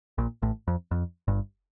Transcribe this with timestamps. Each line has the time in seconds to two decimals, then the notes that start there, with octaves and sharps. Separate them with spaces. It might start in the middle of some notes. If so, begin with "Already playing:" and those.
0.18 A#1 A#2
0.42 A1 A2
0.68 F2
0.91 F2
1.28 G1 G2